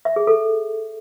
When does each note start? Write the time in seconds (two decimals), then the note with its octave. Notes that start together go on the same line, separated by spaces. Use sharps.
0.05 E5
0.16 G#4
0.27 A4